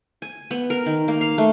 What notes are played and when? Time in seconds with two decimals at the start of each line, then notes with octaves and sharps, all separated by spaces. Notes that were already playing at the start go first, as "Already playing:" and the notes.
0.22 G#5
0.51 B3
0.70 A#4
0.86 D#3
1.08 A#3
1.21 F5
1.38 A3